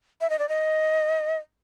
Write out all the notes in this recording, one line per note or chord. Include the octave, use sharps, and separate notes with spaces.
E5
D#5
D5
D#5